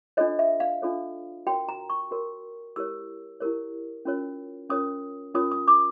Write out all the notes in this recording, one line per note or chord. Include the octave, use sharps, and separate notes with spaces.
D4 F4 A4 C#5 D#5
E5
F5
D4 F4 A4 C#5
F#4 A#4 C#5 G5
A#5
C#6
F#4 A#4 C#5
E4 G4 A#4 C#5 E6
E4 G4 A#4 C#5
C#4 F4 A#4 C#5
C#4 F4 A#4 C#5 D#6
C#4 F4 A#4 C#5 D#6
D#6
D6